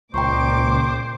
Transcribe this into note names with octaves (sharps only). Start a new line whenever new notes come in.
C#2 A#2 C5 G5 A#5 C#6 D6